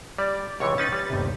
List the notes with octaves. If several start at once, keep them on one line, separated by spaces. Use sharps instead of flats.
G3 D5
C#2 C3 E3 C#5 C#6
C#4 D#4 B4 A6
G3
G1 D#2 C3